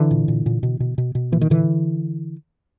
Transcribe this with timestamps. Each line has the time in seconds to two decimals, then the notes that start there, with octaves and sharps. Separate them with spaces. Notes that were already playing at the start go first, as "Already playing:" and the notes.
Already playing: D3 E3
0.11 A#2
0.28 A#2
0.46 A#2
0.63 B2
0.80 B2
0.98 B2
1.15 B2
1.32 A#2 E3
1.41 D#3
1.50 A#2 D3 E3